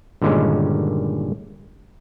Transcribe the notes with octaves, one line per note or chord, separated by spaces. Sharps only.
G2 A#2 D3 D#3 G#3 C#4